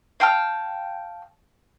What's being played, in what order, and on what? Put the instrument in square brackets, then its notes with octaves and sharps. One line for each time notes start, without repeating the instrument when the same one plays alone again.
[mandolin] F5 G5 A5 F6